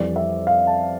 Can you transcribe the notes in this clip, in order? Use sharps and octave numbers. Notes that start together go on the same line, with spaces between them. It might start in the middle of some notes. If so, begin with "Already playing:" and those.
Already playing: F2 E3 G3 D5
E5
F5
A5